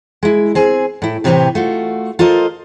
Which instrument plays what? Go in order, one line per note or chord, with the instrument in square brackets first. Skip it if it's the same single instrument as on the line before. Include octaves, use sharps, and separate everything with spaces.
[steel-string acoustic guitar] G#3 E4
C4 G#4 G#5
A2 E4
A2 C3 E3 C4 G4 C#5
A3 F4 F#4
F4 A4 A#4 C5 D#5